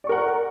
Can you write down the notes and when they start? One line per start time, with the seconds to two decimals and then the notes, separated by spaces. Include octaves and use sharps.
0.04 D5
0.07 C#6
0.09 A#4
0.12 F#5